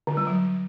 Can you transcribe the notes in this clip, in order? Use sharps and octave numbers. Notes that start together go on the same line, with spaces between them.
D3
G3
F#3